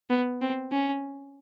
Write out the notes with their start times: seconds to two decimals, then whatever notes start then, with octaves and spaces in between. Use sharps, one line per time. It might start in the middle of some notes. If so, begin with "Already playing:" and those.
0.10 B3
0.41 C4
0.72 C#4